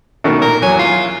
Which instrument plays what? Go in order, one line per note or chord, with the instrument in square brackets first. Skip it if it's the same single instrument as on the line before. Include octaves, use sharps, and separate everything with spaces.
[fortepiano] B2 D#3 A3
[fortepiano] A#2 [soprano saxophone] A#4
[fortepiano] E2 F#3 [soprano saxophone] G#5
[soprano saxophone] F4